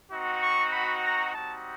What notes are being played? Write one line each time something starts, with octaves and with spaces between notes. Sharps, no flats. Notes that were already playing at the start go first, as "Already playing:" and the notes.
C4 D#4 F#4
C#6
B5
A#5
G3 C4 D#4 F#4 A5